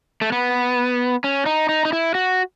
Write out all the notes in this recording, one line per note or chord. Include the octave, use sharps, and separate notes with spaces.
A3
B3
C#4
D#4
D#4
D#4
E4
F#4